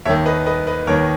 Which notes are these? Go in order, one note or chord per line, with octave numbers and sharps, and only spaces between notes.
D#2 D#3 C#5 E5
B4 D#5
B4 D#5
B4 D#5
D#2 D#3 A#4 C#5